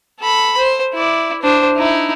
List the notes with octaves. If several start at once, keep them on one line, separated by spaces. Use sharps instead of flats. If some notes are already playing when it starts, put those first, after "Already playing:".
A4 B5
C5
E4 D5
D4 C5
D#4 E4